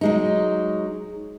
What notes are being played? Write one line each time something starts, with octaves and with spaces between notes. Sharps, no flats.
F#3 G#3 D#4